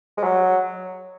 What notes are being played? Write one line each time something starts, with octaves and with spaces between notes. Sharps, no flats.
G#3
F#3